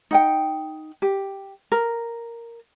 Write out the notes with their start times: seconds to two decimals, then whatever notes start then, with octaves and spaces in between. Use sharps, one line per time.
0.11 D#4 F#5 G5
1.02 G4
1.72 A#4